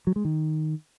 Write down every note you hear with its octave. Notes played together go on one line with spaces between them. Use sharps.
F#3
G#3
D#3